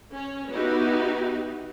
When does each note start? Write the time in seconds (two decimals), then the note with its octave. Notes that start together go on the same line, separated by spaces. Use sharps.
0.14 C#4 C#5
0.51 B3 D#4 E4 F#4 G4